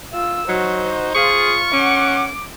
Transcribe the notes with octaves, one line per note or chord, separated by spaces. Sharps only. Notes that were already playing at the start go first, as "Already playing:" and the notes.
F4 E6
F#3 D#4 F#4 C5
F4 G#4 C#6
C#4 F#5 D6